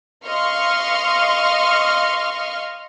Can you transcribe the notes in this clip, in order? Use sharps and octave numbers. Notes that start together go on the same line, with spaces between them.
D#5 F5 C6 C#6 F6